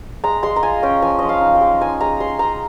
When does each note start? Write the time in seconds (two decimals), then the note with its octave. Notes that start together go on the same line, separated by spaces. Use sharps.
0.24 G#3 A#5
0.43 G#3 C6
0.56 A#5
0.63 F4 G#5
0.83 C#4 G5
1.02 F3 G#5
1.19 F3 D#5
1.29 F5
1.41 D#4
1.55 G5
1.61 G#3
1.81 D#4 G#5
2.01 G#3 A#5
2.20 G#3 C6
2.39 D#4 A#5